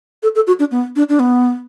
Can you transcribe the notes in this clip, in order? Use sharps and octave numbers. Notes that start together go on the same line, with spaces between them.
A4
A4
F#4
D4
B3
D4
D4
B3